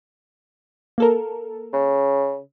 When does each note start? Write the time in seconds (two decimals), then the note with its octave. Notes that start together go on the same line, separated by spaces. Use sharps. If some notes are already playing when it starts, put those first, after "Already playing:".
0.98 A#3 A4 A#4
1.73 C#3